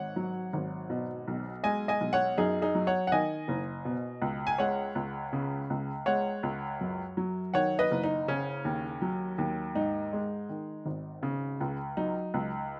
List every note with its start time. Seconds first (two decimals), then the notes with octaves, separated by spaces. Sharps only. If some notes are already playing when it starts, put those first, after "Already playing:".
Already playing: G#1 G#2 C#5 F#5
0.16 F#3
0.53 G#1
0.90 B2
1.28 B1
1.64 G#3 D#5 G#5
1.88 D#5 G#5
2.01 B1
2.13 C#5 F#5
2.38 F#2 D#4 G#4
2.62 D#4 G#4
2.75 F#3
2.87 C#5 F#5
3.07 F#5
3.12 D#3 D#5 G#5
3.48 F#1
3.85 B2
4.22 C#2
4.47 G#5
4.58 G#3 C#5 F#5
4.95 C#2
5.33 C#3
5.70 C#2
6.06 G#3 C#5 F#5
6.43 C#2
6.81 F#2
7.17 F#3
7.54 D#3 C#5 F#5
7.79 B4 D#5
7.91 F#1
8.03 D#4
8.28 C#3 C#4
8.65 D#2
9.02 F#3
9.38 D#2
9.75 G#2 D#4
10.13 G#3
10.49 D#3
10.86 G#1
11.23 C#3
11.61 C#2
11.97 F#3 D#4
12.34 C#2